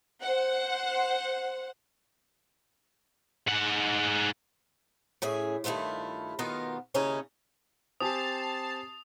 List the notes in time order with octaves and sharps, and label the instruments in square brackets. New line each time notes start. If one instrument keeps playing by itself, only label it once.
[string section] C5 F#5
[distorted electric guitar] G#2 F#5
[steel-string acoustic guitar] A2 C#4 G#4 E5
G2 D#3 A3 E4 F4
B2 D#3 B3 D#4 F4 A#4
D#2 C#3 C#4 D#4 E4 C#5
[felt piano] C4 G4 G#5 [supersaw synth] A5 A6 C7 [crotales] D#6